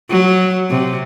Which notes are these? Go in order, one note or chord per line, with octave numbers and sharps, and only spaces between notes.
F#3
C3